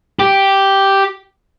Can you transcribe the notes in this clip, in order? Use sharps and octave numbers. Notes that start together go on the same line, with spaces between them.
G4